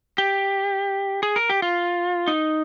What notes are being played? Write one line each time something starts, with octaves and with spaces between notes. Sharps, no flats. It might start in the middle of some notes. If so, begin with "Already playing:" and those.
G4
G#4
A#4
G4
F4
D#4